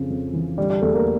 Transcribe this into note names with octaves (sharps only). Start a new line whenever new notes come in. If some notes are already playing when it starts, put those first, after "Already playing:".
Already playing: F2 C#3
F2
E3
D3 G3
G3
E2 A3
A#3